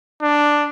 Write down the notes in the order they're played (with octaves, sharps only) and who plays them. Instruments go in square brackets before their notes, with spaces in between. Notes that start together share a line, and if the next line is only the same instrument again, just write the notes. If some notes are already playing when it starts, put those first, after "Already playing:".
[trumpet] D4